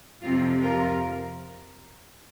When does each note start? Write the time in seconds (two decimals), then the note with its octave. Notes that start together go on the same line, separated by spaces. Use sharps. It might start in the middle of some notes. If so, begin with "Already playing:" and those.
0.22 F2 C3 F3 C4 F4
0.63 F4 A#4